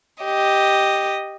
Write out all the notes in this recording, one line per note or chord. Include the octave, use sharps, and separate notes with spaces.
G4 D#5